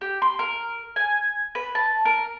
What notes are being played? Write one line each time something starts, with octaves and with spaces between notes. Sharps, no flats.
G4
C6
A#4
G#5
B4
A5
A#4